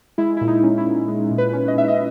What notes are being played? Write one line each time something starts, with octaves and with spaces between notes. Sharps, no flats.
G#3 E4
A#2 E4
D#4
C#4
E4
A#2
G#3
A#2
B4
C#4
D#5
A#2 E5
D#5